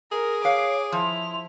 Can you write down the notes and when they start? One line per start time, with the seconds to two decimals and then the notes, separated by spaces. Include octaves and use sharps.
0.12 G#4 A#4
0.44 B4 C#5 F5 D6
0.92 F3 E4 C6 F7